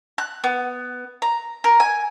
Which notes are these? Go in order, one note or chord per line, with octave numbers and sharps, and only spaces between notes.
F#6
B3
A#5
A#4
G#5